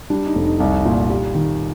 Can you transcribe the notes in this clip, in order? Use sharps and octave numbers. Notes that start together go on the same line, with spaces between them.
G3 D4
D#4
F1
D#4
C2
A#2
G3
D#3